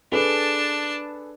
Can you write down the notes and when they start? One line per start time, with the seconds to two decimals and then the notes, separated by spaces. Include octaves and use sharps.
0.12 D4 G#4 A4 B4 A5